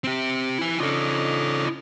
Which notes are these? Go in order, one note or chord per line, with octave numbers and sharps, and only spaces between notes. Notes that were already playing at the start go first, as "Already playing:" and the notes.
C4 G4
E4 G#5
C#3 D4 D#4 F4 A4